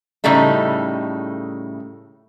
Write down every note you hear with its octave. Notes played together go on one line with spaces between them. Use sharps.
A2 C#3 G3 A3 D#4